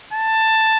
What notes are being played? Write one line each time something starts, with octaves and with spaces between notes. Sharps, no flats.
A5